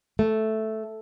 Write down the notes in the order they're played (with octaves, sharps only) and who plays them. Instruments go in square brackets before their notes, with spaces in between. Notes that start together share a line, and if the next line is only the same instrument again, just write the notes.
[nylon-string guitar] A3